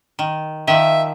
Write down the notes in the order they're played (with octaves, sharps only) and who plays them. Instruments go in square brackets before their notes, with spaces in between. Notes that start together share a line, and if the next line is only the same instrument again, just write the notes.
[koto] D#3
[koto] D#3 F3 [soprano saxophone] E5